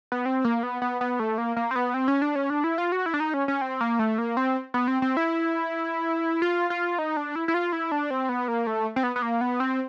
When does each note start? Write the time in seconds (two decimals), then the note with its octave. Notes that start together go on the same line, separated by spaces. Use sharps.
0.12 B3
0.26 C4
0.45 A#3
0.63 B3
0.82 B3
1.01 B3
1.20 A3
1.38 A#3
1.57 A#3
1.71 C4
1.76 B3
1.94 C4
2.08 C#4
2.22 D4
2.36 C#4
2.50 D4
2.64 E4
2.78 F4
2.92 F#4
3.06 E4
3.14 D4
3.20 D#4
3.34 C#4
3.48 C#4
3.61 C4
3.81 A#3
3.99 A3
4.18 A#3
4.37 C4
4.74 B3
4.88 C4
5.02 C4
5.17 E4
6.42 F4
6.70 F4
6.99 D#4
7.17 D4
7.36 E4
7.48 E4
7.54 F4
7.73 E4
7.92 D4
8.11 C4
8.29 B3
8.48 A#3
8.67 A3
8.96 C4
9.03 B3
9.16 B3
9.22 A#3
9.41 B3
9.60 C4